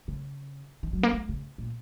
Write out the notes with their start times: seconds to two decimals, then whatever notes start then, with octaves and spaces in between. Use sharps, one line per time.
0.08 C#3
0.83 D#3
0.93 F#3
1.03 A#3
1.13 A3
1.29 C#3
1.58 A#2